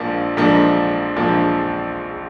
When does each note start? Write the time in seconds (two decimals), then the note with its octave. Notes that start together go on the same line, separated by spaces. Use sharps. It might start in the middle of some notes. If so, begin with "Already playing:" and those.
Already playing: A#1 G#2 F3 A#3 D4
0.37 A#1 G#2 F3 A#3 D4
1.16 A#1 G#2 F3 A#3 D4